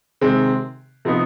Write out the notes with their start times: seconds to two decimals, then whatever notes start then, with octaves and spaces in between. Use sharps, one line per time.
0.21 C3 D#3 G#3 C4
1.05 C3 F3 B3 D#4